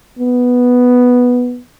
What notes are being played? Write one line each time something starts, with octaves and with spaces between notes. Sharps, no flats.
B3